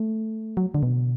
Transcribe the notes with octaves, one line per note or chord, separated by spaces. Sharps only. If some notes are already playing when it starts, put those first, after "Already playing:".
Already playing: A3
F#3
D3
B2